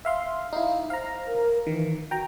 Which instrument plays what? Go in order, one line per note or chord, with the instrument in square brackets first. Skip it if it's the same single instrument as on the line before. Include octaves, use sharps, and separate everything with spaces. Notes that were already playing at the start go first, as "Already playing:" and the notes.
[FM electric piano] E5 F5 C6
[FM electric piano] D#4 E4 [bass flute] F5
[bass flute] C5 [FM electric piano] F5 A#5
[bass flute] A#4
[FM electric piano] D#3 [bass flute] E3
[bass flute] F#4 [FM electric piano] G5 A#5